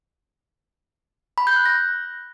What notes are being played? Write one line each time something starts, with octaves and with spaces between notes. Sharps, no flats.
B5
G6
F#6
A#6